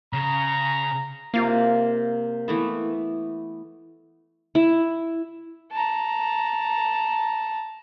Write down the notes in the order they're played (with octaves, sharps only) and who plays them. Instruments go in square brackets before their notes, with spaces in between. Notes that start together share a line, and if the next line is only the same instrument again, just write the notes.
[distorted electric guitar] C#3 [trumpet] A#5
[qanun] C3 F4 F5 [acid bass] A#3
[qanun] E3 A3 B3
E4
[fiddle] A5 A#5